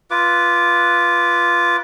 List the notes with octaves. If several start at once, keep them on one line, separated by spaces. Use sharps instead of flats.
F4 B4 D6